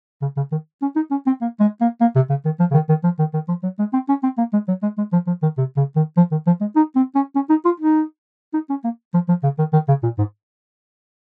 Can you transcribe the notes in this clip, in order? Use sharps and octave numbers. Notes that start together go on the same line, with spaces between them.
C#3
C#3
D#3
C#4
D#4
C#4
C4
A#3
G#3
A#3
A#3
C3
C#3
D#3
F3
C#3
D#3
D#3
F3
D#3
D#3
F3
F#3
G#3
C4
C#4
C4
A#3
G#3
F#3
G#3
G#3
F3
F3
D#3
C3
C#3
D#3
F3
D#3
F3
G#3
D#4
C4
C#4
C#4
D#4
F4
D#4
D#4
C#4
A#3
F3
F3
C#3
D#3
D#3
C#3
A#2
G#2